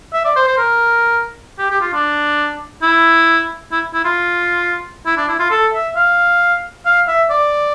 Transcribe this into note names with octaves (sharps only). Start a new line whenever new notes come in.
E5
D5
C5
C5
A#4
G4
G4
F4
D4
E4
E4
E4
F4
E4
D4
E4
F4
A4
E5
F5
F5
E5
D5